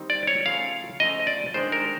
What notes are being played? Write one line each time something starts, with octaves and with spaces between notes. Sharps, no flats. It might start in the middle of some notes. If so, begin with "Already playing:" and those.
Already playing: D#3 G3 C4 D#4
D5
C#5
C#3 F3 A3 F5
C#3 F3 A3 D#5
D5
D#3 G#3 B3 D4 C5
A#4